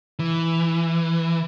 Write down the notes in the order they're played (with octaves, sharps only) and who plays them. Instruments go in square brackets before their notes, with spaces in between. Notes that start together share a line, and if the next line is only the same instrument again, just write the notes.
[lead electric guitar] E3